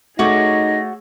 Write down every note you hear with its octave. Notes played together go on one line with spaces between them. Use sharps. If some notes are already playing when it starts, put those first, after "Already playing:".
A3 D#4 F#4 G#4 C#5 D6 A#6